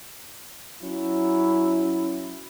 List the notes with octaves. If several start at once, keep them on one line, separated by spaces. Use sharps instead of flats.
F#3 C#4 E4